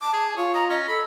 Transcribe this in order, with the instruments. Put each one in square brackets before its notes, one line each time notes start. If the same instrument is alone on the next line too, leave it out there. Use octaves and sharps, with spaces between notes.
[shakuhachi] A5 [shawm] D6
[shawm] G#4
[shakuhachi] F4 [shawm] C#5
[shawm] D#5 [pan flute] A#5
[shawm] C#4 [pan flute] D#5
[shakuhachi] A4 [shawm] B5